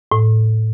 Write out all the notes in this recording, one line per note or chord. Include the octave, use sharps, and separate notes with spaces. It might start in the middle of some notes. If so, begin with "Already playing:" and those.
A2